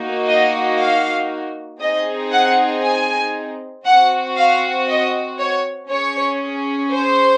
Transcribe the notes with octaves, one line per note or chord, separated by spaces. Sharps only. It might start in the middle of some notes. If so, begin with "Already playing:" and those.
Already playing: A#3 D#4 F#4
D#5
F5
C4 D#4 G#4 D#5
F#5
G#5
C4 F#4 F#5
F5
D#5
C#5
C#4 G#4 C#5
C5